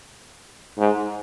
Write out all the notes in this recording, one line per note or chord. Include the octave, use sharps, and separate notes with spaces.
G#2